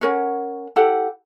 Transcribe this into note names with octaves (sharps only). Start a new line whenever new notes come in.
C#4 A#4 C#5 F#5
E4 G4 A4 F#5